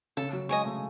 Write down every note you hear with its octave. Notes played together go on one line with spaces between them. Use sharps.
C#3 A4
F#3
G#3 D#5 G#5 C#6
A3